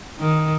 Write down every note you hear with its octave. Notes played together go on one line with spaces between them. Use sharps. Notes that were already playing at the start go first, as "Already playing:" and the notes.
D#3